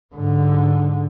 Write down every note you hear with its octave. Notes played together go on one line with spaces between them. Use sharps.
G#2 D3